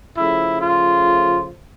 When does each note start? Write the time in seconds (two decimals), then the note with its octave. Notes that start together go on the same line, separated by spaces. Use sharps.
0.17 C#3 F3 A3 E4
0.62 F4